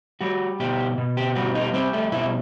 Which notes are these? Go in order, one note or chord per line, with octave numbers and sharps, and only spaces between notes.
G3 F#4
B2 G4
B2
G4
G3 F#4
D#4
G3 C4
A3
B2 E4